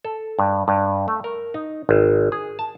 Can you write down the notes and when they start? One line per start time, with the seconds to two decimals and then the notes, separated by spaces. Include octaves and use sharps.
0.05 A4
0.39 G2
0.68 G2
1.08 A3
1.24 A#4
1.54 D#4
1.89 G#1
2.32 G#4
2.59 A5